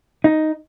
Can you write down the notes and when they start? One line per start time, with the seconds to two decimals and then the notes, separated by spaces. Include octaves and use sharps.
0.24 D#4